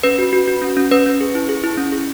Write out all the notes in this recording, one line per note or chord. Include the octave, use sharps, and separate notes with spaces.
C#4 B4
F#4
F#4
F#4
C#4
C#4
C#4 B4
C#4
G#4
E4
G#4
E4
C#4
G#4